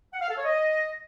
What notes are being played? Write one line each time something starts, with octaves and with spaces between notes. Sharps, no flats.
F#5
F5
A4
C#5
D#5